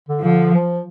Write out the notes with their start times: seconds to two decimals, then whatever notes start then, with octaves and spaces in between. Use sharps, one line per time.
0.09 D3
0.24 D3 F3
0.54 F3